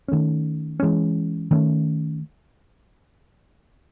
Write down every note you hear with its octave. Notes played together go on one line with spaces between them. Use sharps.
D#3 A3 C#4
E3 G#3 C#4
D#3 A3 C#4